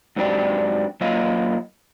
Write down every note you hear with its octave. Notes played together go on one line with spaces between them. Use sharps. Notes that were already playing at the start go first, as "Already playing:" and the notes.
G#2 F#3 C4 D4 G4
F#3 A#3 F4 C#5 D#5 F5